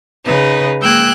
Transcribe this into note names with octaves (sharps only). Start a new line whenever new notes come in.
C#3 D#4 B4
G#3 A#3 G5 E6 F#6 G#6